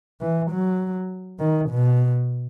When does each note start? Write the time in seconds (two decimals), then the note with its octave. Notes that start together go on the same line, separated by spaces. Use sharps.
0.21 E3
0.51 F#3
1.40 D#3
1.70 B2